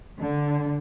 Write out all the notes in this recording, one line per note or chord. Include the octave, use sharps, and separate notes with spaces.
D3